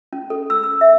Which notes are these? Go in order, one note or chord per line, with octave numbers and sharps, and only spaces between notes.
C#4
A4
E6
E6
E5